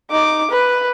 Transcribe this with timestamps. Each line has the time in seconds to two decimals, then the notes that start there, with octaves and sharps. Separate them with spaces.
0.11 D#4 D6
0.50 B4